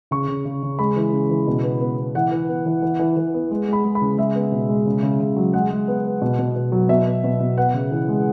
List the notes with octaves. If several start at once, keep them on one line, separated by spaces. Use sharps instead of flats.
C#3 C#6
C#3
C#3
C#3
G#3 B5
E3
C#3
E3
B2
B3
B3
B3
E3 F#5
E3
B3
E3
E3
E3
E3
B3
G#3
G#3 B5
G#3
B5
C#3
G#3 E5
B3
B2
G#3
C#3
C#3
C#3
F#3
G#3 F#5
G#3
B3
B3
B2
B2
B2
F#3
B2 E5
B3
B2
B2
B3 F#5
C#3
E3
G#3